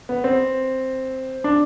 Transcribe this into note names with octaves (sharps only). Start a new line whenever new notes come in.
B3
C4
D4